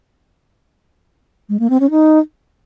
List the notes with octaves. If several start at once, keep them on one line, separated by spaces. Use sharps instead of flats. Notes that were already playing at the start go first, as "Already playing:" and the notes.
G#3
A#3
C4
C#4
D#4